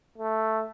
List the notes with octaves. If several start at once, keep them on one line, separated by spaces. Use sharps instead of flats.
A3